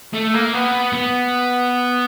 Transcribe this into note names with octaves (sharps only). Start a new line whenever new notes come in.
A3
A#3
B3
B3